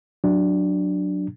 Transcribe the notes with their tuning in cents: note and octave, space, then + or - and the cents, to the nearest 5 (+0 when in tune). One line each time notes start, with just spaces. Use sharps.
F#3 +0 D4 +0